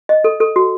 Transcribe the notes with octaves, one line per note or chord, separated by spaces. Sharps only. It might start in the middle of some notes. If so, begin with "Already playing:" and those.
D#5
A4
A4
F#4